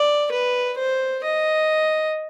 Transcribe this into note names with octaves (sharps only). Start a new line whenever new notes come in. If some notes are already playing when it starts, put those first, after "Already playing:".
Already playing: D5
B4
C5
D#5